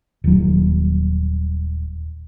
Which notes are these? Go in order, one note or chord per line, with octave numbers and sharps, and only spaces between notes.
D#1 F#3